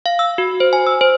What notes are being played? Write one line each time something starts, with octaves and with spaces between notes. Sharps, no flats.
F5
E6
F#4
C5
G#5
E6
C5